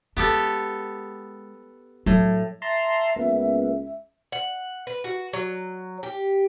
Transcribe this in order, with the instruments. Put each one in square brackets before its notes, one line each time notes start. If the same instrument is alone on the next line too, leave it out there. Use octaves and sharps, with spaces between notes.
[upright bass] G#3 [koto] B3 G4 A4
[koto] A2 [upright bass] F#3
[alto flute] E5 [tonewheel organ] A5 A#5 C6
[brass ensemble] C#2 [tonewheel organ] A#3 B3
[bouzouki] F#5
B4
F#4
F#3
G4